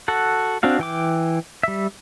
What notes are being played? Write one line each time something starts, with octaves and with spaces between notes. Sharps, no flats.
F#4 A4 F#5
C4 D4 F#4 F5
E3 G5 D6
G3 E5